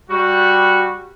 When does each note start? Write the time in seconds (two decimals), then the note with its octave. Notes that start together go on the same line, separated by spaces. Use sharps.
0.10 G3 F#4